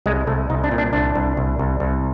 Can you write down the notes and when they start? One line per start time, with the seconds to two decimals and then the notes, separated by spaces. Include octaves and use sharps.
0.06 C2 G#3
0.27 C2 A3
0.50 C2 D#4
0.64 D4
0.71 A#2
0.78 D4
0.93 C2 D4
1.16 C2
1.37 C2
1.59 C2
1.80 C2